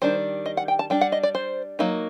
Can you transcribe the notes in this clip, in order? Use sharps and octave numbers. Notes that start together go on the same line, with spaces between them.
D#3 G3 D4 C5
D#5
F#5
G5
A5
G3 D4 G5
F#5
D#5
D5
C5
F#3 A#3 D#4